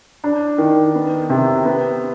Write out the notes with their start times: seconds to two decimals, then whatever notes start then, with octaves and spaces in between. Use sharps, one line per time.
0.24 D4
0.58 D#3
0.95 B3
1.29 C3
1.65 B3